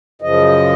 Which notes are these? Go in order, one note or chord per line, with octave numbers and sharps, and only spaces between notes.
F#2 C#3 F3 D#5